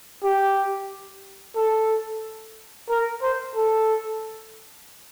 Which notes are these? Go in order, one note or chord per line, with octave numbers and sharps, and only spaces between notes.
G4
A4
A#4
C5
A4